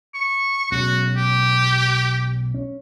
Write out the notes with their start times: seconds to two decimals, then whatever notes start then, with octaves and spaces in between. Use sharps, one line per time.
0.14 C#6
0.72 B1 G#3 C#4 F#4
1.17 G4
2.54 C#4